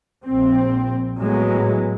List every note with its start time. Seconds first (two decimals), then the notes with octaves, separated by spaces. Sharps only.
0.25 A#1 C4
1.17 A2 F#3 G#3 B3